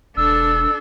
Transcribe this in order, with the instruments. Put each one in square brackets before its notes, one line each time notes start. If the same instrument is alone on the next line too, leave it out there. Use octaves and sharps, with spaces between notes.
[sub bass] E1 [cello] D4 A4 [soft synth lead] E6